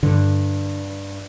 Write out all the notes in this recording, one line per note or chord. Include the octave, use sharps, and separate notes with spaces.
G2 D3